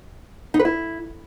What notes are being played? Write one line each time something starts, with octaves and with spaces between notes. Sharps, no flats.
D#4
B4
E4